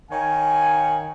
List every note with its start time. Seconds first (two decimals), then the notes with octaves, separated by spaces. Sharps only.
0.11 D#3 C#5 F5 G#5